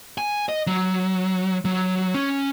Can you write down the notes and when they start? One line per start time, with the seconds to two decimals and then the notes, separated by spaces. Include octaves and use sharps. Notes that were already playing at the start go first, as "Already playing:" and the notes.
0.18 G#5
0.49 D#5
0.67 F#3
1.65 F#3
2.14 C#4